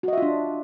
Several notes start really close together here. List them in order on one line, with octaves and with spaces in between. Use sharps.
F#4 D#5 E5 F4 D4